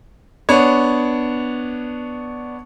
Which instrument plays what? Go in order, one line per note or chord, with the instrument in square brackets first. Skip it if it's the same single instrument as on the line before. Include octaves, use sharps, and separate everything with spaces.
[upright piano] B3 D4 C#5